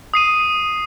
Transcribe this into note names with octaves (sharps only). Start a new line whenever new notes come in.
D#6 C7 D#7